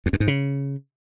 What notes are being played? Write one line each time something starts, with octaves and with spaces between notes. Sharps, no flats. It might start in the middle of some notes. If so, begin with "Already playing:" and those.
F2
F#2
G#2
C#3